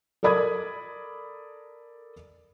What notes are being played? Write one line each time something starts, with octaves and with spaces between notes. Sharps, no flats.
A4 A#4 D5 B5 D#6 G#6